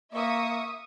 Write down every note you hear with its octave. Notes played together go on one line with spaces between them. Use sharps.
A#3 E5 C#6 D#6